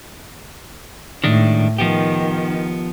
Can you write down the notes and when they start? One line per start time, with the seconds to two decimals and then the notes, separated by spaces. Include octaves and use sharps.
1.24 A2 D#3 G#3 D4
1.78 D#3 F3 B3 G4